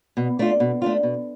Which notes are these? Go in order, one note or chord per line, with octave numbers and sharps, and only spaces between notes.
B2
A3 D4 F4
B2
A3 D4 F4
B2